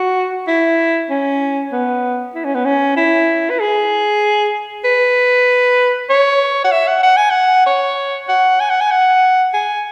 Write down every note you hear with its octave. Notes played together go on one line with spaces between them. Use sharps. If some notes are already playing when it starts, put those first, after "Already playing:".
Already playing: F#4
E4
C#4
B3
E4
C#4
B3
C#4
E4
B4
G#4
B4
C#5
F#5
E5
F#5
F#5
G#5
F#5
C#5
F#5
G#5
F#5
G#5
F#5
G#5